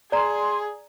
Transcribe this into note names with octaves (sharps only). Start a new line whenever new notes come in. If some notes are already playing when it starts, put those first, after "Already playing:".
G#4 D5 A#5 C6